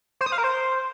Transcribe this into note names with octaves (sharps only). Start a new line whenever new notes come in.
C5
D#6
F5
A#4
C5